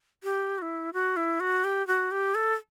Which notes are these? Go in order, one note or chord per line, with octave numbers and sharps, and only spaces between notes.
G4
F#4
E4
F#4
E4
F#4
G4
F#4
G4
A4